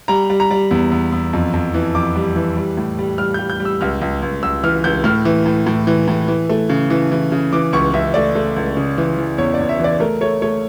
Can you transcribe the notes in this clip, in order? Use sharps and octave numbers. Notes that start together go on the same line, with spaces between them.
G3 A#5
G3
A#5
G3
E2
E2
E2
F2
F2
E3
F2 D6
G3
E3
G3
A2
G3
G3 F6
G3 G6
G6
G3
E6
C#2 F6
C#2
C#2
C#2 E6
E3 F6
C#2 G6
A2 F6
E3
A2
A2
E3
A2
E3
A3
C#3
E3
E3
C#3
E3 D6
C#2 C#6
C#2 E5
A3 D5
A3
C#2
C#3
E3
E3
E2 C#5
D5
E2
E5
E3 D5
A3 A#4
A3 C#5
A3 C#5